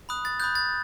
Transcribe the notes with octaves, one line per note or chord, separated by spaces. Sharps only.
B5 D#6 F#6
A6
B5 D#6 F#6 G6
A6